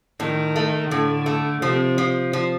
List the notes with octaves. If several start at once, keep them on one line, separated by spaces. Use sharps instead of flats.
A2 D#3
A3
A2 D3
A3
C3 F3
F3
F3